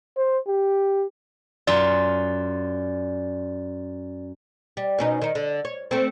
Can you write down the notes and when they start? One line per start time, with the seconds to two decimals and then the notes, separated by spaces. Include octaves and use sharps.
0.17 C5
0.48 G4
1.67 F#2 F4 D5
4.77 G3
4.99 B2 C#4 D#4
5.22 D#3 D#4
5.35 D3
5.65 C#5
5.91 A3 C4